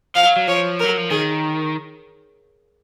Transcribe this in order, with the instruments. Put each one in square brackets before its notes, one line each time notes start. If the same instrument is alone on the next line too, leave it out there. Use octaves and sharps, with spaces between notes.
[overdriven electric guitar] F3 [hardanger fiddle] F5
[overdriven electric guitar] F#3
F#3
[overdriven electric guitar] F3 [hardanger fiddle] C#5
[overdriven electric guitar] F#3 [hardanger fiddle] A#4
[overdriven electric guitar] F3
[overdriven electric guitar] D#3 [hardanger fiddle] G#4